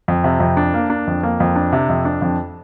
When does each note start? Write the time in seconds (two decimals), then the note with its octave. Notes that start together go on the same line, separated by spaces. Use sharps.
0.08 F2
0.24 C3
0.40 F2
0.57 D4
0.74 A#3
0.90 D4
1.07 F2
1.23 A#3
1.40 F2
1.56 D4
1.72 C3
1.89 F2
2.05 D4
2.22 F2